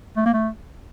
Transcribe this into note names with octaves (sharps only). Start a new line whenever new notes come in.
A3
A#3
A3